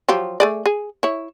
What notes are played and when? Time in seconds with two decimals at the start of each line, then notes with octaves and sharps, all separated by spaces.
0.09 F3 F#3 G4
0.40 A3 G#4 D5
0.66 G#4
1.03 E4 C#5